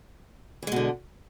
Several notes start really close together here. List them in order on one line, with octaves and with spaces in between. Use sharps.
E3 G#3 B2 D3